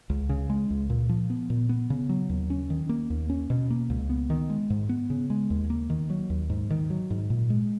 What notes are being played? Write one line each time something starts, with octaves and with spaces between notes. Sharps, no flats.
C#2
C#3
G#3
C#2
A#2
F3
B3
A#2
B3
C#3
F#3
D#2
C#4
D#3
A#3
D#2
C#4
B2
A#3
C#2
B3
D#3
G#3
G#2
B3
C#3
G#3
D#2
A#3
D#3
F#3
D#2
G#2
D#3
F#3
G#2
A#2
G#3